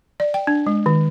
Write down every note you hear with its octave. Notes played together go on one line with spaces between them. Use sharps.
D5
G5
D4
G#3
D#3